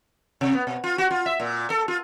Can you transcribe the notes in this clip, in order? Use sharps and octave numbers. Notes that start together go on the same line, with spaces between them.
C3
B3
B2
F4
F#4
F4
E5
A#2
A4
F4